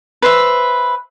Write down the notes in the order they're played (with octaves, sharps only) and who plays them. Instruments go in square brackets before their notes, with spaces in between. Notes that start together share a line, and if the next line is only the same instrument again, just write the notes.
[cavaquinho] B4 C5 E5